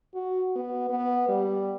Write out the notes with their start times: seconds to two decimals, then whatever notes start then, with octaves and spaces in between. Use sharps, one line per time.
0.14 F#4
0.56 B3
0.90 B3
1.28 G3